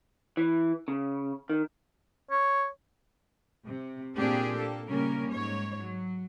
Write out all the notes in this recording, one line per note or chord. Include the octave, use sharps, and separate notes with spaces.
E3
C#3
D#3
C#5
C3
A#2 A#3 C4 D4 G4 G#4
A#3 A4
C#3 G3 A#3 C#4 A#4
G#2 C#5
F#3